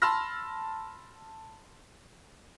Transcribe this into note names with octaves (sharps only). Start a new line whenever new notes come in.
A5 B5 C6 E6 F6 A#6